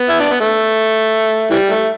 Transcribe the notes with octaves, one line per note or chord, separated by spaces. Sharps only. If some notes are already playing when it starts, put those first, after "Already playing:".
Already playing: B3
E4
D4
B3
A3
E3 G3
A3